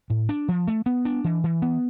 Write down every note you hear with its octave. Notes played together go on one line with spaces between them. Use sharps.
A2
D4
F3
A3
B3
D4
E3
E3
B3